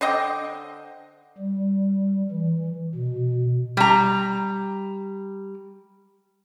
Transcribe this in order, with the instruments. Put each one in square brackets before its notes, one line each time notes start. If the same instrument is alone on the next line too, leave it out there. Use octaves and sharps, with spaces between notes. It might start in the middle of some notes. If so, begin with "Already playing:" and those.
[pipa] D3 C5 D#5 G5
[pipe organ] G3
E3
B2
[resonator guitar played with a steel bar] G3 A#5